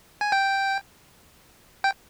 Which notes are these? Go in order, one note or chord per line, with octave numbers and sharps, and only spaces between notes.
G#5
G5
G5